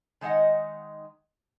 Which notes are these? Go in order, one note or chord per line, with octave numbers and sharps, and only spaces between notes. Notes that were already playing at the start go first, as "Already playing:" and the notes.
D#3 G#3 D#4 D#5 F#5